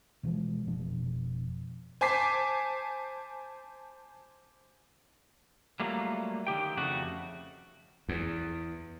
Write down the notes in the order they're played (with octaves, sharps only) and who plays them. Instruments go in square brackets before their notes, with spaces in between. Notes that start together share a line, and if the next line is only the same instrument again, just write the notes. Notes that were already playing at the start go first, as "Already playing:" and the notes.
[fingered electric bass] B2 E3 F3 G#3
F1 B2 F3 D4
[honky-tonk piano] C5 G#5 A5 D6 B6 C7
[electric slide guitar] F#3 G3 A3 A#3 F4
D3 D#3 G4 G5
F2 C#3 A3 F#4
[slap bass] E2